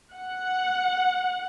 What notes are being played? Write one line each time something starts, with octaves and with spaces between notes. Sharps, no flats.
F#5